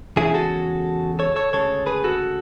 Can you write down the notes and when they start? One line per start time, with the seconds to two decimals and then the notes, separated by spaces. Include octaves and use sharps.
0.16 E2 C#3 G#3 E4 G#4
0.34 F#4 A4
1.19 A4 C#5
1.36 A4 C#5
1.53 D2 C#3 G#3 A4 C#5
1.86 G#4 B4
2.04 F#4 A4